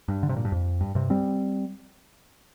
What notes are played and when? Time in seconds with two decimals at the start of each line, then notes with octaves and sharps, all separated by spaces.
0.08 G2
0.23 D3
0.29 C3
0.36 A#2
0.45 G2
0.52 F2
0.81 G2
0.95 G2 C3
1.10 G3 C4